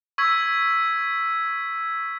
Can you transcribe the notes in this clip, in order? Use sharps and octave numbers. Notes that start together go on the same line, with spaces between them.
C#6 E6 G#6 B6